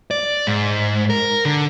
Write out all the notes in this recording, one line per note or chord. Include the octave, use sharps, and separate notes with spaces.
D5
G#2
A#4
D3